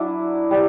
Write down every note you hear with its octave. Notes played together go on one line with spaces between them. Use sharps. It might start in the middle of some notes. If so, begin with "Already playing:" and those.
Already playing: F#3 D4 E4
G3